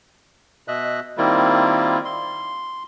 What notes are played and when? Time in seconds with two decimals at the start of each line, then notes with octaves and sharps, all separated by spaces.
0.68 B2 D#5 E5 F#6
1.18 D#3 G3 A#3 C4 E4 F4
2.05 C6